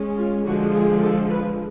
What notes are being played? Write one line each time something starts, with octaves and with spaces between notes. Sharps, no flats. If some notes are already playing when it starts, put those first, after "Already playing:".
Already playing: G#3 C#4
F4
D3 F3 G#3 F#4
G#4
A4
B4